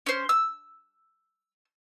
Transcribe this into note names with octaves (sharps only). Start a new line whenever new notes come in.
C#4 C5
E6